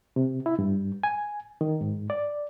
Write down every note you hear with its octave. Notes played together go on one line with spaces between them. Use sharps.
C3
E4
G2
G#5
D#3
G#2
D5